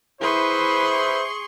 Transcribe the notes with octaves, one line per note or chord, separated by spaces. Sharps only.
E4 G#4 B4 C5 C6 C#6